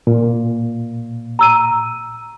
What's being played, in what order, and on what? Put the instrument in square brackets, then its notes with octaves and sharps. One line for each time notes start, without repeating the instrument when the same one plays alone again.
[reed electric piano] A#2
[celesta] A#5 E6 D#7